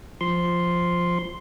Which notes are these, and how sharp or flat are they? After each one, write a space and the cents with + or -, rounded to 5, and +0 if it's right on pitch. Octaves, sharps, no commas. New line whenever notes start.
F3 +0 C6 +0